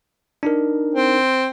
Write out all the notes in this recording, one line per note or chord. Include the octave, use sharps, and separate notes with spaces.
D4 D#4 A#4
C4